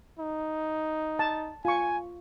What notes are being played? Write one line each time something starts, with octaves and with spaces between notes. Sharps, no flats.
D#4
A5
F4 G#5 C#6